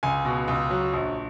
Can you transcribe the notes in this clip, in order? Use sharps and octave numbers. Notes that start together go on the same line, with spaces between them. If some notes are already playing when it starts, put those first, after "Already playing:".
C#2 G#5
B2
C#2
F#3
A#1